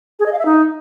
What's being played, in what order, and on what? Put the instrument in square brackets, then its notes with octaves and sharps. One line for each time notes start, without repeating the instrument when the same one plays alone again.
[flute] G#4
D#5
F5
E5
D#4